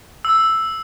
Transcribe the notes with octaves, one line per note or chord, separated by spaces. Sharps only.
E6